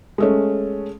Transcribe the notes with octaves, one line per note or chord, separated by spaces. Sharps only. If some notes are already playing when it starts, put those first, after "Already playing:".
G#3 A3 C#4